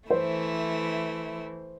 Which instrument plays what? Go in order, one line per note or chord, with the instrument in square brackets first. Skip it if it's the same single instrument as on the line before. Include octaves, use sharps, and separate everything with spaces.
[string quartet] E3 A3 E4 [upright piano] C5